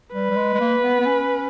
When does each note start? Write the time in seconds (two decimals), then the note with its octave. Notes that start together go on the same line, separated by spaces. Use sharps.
0.13 G3 B4
0.30 G3
0.36 G#3
0.54 G#3
0.60 A#3
0.83 B3
1.00 B3
1.06 C#4